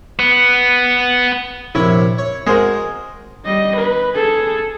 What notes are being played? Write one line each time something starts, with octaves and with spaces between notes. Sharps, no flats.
B3
A#1 C3 E4 C#5
C#5
G#3 F#4 G#4 A#4 C5
G3 D#5
B4
G#4 A4